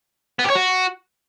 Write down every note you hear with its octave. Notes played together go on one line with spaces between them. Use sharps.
B3
G4
C#5
F#4